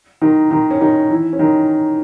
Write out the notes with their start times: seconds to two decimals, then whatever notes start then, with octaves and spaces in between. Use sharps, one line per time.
0.21 D#3 D#4
0.51 D#3 D#4
0.71 C#4
0.80 D#3 D#4
1.10 E3 E4
1.33 C#4
1.39 D#3 D#4